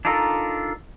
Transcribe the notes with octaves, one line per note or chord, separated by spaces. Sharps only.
D4 D#4 F4 A4 A#4